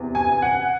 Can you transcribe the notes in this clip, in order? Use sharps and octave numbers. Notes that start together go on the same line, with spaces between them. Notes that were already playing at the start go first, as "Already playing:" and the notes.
Already playing: E2 C3
G#5
F#5